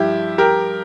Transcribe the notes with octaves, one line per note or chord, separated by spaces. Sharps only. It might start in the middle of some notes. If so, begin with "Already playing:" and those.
Already playing: G2 F3 E4 G4
G4 A#4